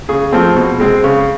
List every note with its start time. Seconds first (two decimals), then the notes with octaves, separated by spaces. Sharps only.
0.09 C#3 G#4
0.32 F3 A3 C4
0.56 B2
0.80 G#3 C4
1.04 C#3